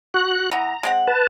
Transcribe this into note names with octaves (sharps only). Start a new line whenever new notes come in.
F#4 F#6
E3 B3 A#5
G#3 C4 F#5
B4 A5